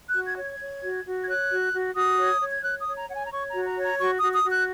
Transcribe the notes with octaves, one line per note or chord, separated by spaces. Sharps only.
F#6
F#4
G#6
C#5
G#6
C#5
F#4
F#4
G#6
C#5 F#6
F#4
F#4
F#4 D#6
C#5
C#5
G#6
C#5 F#6
D#6
C#5
A#5
C#5 F#5
G#5
A#5
C#5 C#6
A#5
F#4
A#5
C#5
A#5
F#4 C#6
D#6
F#4
D#6
F#4
F#6